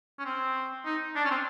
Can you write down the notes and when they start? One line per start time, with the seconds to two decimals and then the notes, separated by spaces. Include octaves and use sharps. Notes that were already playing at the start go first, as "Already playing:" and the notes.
0.19 C#4
0.25 C4
0.85 D#4
1.16 D4
1.25 C#4
1.31 C4